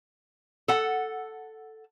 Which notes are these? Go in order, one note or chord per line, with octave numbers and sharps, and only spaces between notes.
A4 F#5